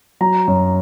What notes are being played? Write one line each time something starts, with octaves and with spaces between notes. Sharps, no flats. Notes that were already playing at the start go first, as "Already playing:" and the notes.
F#3 A#5
F#2